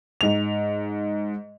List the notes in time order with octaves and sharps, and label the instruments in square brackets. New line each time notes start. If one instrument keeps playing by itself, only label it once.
[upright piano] G#2 F7